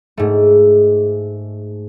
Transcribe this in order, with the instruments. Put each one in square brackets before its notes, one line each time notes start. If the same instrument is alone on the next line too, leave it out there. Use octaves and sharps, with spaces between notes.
[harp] G#2 A3